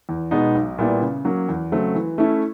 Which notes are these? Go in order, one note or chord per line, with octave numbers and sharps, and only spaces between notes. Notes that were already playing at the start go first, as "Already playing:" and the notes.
E2
B2 G#3 B3 D#4
B1
A#2 G3 B3 E4
C#3
F#3 A#3 C#4
E2
C#3 F#3 A3 C4
E3
A3 C#4 E4 A4